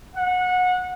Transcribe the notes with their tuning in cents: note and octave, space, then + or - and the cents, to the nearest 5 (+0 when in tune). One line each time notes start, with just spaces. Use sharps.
F#5 -25